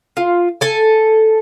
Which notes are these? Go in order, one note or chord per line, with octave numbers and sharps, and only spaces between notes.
F4
A4 G#5